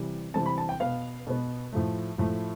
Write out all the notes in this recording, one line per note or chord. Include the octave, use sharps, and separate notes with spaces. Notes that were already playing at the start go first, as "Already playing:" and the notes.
Already playing: C3 E3 G3
C3 E3 G3 C4 A5
B5
A5
G5
B2 B3 F5
B2 B3
A2 F3 A3
A2 F3 A3